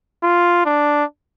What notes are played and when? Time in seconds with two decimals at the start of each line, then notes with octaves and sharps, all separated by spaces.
0.23 F4
0.66 D4